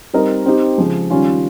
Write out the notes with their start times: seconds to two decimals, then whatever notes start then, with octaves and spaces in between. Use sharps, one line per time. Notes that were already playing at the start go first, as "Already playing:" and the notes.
0.13 G3 C4 D#4 A#4 D#5
0.46 C4 D#4 G4
0.78 C#3 F3 G#3
1.10 D#3 G3 C#4 F4